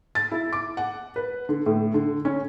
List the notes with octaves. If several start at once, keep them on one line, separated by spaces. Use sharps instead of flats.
A6
E4
D6
F#5
B4
D3
A2
D3
C#4